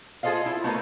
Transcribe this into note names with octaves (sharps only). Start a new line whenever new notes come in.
F4 G#4 A4 C5 D#5 F5
E4
A3 B3 D#4 A#4 B4 C#5